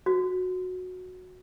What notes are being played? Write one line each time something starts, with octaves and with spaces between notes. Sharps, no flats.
F#4